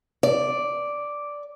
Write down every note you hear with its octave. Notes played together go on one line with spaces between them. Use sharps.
D5